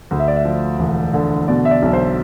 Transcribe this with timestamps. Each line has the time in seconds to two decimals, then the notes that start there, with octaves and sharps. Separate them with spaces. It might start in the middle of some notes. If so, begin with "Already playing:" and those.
0.11 D2
0.19 E5
0.28 D5
0.36 E5
0.45 F3
0.79 E1
1.14 D3
1.48 B2 D5
1.65 E5
1.71 D5
1.82 B1
1.93 C5